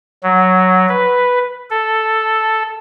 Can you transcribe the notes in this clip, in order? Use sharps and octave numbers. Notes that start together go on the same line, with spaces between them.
F#3
B4
A4